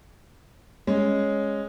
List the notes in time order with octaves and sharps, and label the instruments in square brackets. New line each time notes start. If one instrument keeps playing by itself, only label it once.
[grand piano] G#3 C#4